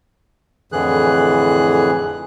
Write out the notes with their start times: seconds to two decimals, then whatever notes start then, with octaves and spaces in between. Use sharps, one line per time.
0.72 F2 A2 D3 E3 G#4 F#6